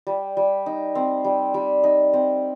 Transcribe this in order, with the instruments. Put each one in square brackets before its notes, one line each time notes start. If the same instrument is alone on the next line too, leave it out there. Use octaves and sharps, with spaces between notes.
[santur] G3
G3
D#4
C4
G3
G3
D#4
C4